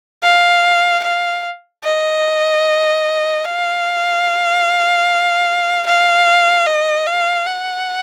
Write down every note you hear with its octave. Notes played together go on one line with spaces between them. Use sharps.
F5
F5
D#5
F5
F5
D#5
F5
F#5